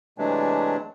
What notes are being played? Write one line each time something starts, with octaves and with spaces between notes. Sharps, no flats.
C3 E3 F#3 G#3 A3 D4